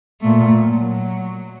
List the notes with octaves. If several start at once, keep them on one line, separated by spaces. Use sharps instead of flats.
A#2 A3
F#3